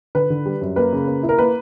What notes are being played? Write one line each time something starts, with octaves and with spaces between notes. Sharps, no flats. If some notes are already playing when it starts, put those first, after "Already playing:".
D3 B4
D3
G3
F#2
A#3 B4
C#3
A#3
E4
A#4
A#3 B4